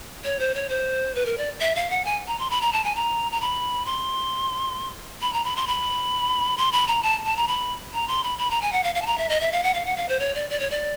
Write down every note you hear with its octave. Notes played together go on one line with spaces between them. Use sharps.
C#5
C5
C#5
C5
B4
A#4
D5
E5
F5
F#5
G#5
A#5
C6
B5
A#5
A5
G#5
A#5
A#5
B5
C6
B5
A#5
B5
C6
B5
C6
B5
A#5
A5
A5
A#5
B5
A#5
C6
B5
B5
A#5
G#5
F#5
F5
F5
A5
A#5
E5
D#5
E5
F5
F#5
F5
F#5
F5
C5
C#5
D5
D5
C#5
D5